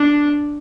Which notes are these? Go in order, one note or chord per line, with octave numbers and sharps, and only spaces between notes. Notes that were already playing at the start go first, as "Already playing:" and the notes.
Already playing: D4